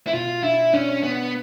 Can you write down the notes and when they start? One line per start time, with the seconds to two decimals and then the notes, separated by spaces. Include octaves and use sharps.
0.07 E4
0.14 B2 F4
0.43 D4 E4
0.73 C#4 D4
1.03 B3 D4